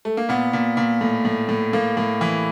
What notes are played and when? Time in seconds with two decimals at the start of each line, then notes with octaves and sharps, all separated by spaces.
0.05 A3
0.17 A#3
0.29 A#2 B3
0.53 A#2
0.77 A#2
1.01 A2
1.25 A2
1.49 A2
1.73 A2 A#3
1.97 A2
2.21 E3